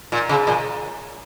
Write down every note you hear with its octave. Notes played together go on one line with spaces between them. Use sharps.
A#2
C#3
A#2